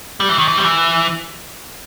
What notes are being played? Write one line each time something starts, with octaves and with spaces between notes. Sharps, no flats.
G3
E3
D#3
E3
G3
E3